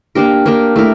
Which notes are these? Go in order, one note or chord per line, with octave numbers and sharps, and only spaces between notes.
A#3 D4 G4 A#4
A#3 D4 G4 A#4
A3 E4 A#4